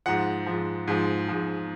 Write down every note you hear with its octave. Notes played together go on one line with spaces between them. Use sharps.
G#2 F3 F#5
G#2 F3
G#2 F3
G#2 F3